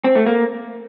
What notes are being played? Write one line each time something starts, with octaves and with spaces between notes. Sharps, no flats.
C4
A3
A#3